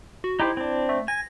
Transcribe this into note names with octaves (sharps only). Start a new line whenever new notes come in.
F#4
D#4 E4 G4 C5
C4 D4
A3
G#5 A#6